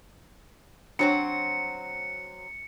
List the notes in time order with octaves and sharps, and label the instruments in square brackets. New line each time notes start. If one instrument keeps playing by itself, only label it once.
[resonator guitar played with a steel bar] F#3 C4 F#4 [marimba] D4 C5 C#5 [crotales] C#7